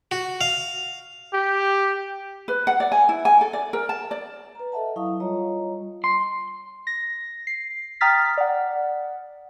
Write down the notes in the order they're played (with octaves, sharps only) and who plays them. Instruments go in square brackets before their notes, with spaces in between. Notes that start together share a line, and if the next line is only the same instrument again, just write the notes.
[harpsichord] F#4
F5
[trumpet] G4
[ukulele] B4
F#5
D5
G#5
E4
G#5
A4
D5
A#4
A5
D5
[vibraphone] B4 A#5
A4 D#5 E5 F#5 A5
F#3 E4 F5 C#6 D#6
G3 F4 C#5 D#5 A#5
[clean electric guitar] C6
[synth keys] A#6
C7
G5 A#5 D#6 F6 A6 B6
D5 F#5